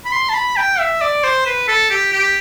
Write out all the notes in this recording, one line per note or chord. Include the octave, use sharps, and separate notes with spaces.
B5
C6
A5
B5
G5
E5
D5
C5
B4
A4
G4
G4